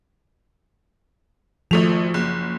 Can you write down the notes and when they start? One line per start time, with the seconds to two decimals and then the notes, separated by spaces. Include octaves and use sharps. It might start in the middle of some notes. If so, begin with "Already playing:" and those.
1.71 G#1 F3 A3 F7
2.14 F#1